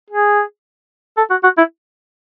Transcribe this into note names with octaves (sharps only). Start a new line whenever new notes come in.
G#4
A4
F#4
F#4
E4